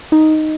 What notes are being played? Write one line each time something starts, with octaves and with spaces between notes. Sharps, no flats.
D#4